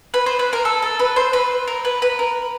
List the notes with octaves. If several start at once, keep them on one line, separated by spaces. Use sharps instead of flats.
B4
C5
B4
A#4
A4
A4
B4
C5
B4
A#4
B4
B4
A#4